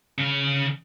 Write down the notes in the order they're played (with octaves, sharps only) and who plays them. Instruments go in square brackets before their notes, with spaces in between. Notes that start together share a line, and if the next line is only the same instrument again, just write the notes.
[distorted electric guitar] C#3 F5